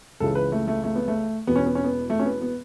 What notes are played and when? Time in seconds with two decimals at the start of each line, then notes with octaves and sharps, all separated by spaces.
0.20 C#2 C#3 E3 A4
0.35 B4
0.52 A3
0.68 A3
0.84 A3
0.95 B3
1.08 A3
1.47 E1 E2 B2 B3
1.56 C#4
1.66 B3
1.75 C#4
1.84 B3
2.10 A3
2.19 C#4
2.25 B3
2.42 B3